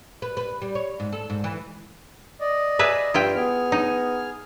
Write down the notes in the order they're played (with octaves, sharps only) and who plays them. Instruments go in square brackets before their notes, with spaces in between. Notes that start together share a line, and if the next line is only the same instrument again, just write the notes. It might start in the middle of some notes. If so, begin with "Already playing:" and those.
[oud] B4
B4
G3
C#5
G#2
A4
G#2
E3
[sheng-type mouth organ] D5 D#5
[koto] G#4 B4 E5
[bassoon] G2 [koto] E4 F4 G5
[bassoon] B3 [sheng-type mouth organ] G#4 F6
[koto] D#4